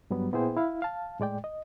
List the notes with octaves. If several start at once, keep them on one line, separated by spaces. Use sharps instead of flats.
G2 F#3 G3 B3
A#2 B3 E4 G#4 C5 G5
E4 F5
F5 A5
A2 G#3 D5 G5
D#5